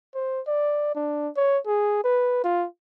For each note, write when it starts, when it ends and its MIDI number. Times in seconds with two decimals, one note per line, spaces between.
0.15 0.41 72
0.47 0.91 74
0.95 1.29 62
1.37 1.58 73
1.67 2.03 68
2.04 2.42 71
2.44 2.67 65